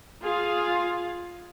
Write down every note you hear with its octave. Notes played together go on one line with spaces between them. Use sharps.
F4 G#4 F5